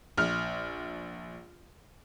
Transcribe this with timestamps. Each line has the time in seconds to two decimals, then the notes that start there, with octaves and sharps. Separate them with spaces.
0.18 A#1 F6